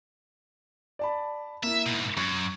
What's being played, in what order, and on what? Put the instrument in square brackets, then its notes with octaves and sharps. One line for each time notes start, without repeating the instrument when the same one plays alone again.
[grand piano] D5 A5 B5
[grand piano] A#3 E4 [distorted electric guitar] E5
[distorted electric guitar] G#2 B2
[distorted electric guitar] F#2 [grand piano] C#6 G#6